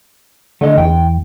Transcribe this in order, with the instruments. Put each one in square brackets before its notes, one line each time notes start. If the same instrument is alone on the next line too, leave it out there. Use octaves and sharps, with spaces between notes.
[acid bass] D3 [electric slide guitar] A3 D#5
[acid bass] E2 [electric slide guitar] G5